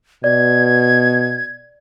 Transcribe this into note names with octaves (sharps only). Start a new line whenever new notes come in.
B2 D5 G#6